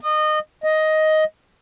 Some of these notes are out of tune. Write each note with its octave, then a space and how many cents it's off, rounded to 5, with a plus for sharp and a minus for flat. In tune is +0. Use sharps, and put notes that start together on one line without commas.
D#5 -25
D#5 +5